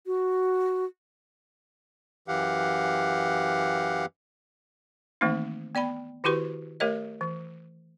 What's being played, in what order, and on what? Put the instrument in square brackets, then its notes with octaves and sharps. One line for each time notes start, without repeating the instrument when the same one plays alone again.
[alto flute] F#4
[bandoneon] F#2 E3 G4 F5 F#5
[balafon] D#3 E3 A3 A#3 C4 D#4
B3 D5 G5 B5
D#3 E4 F#4 G4 B4 C#6
A3 G4 A#4 C#5 D#5
E3